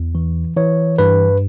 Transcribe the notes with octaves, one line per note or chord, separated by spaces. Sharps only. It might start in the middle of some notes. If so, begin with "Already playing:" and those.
Already playing: E2
E3
E3 C#5
G2 B4